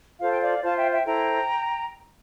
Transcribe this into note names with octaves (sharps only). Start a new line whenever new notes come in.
F4 A4 C5 F5
G5
D5 F5
F4 C5 F5 A5
E5 G5
E5 G5
E4 A4 C5 G5 A#5